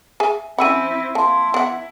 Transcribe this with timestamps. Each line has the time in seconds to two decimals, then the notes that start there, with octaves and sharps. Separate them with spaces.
0.20 G#4 E5 G#5
0.58 C4 C#4 E4 E5 F#5 B5 E6 D#7
1.15 A#3 E4 A5 C6
1.54 B3 F#5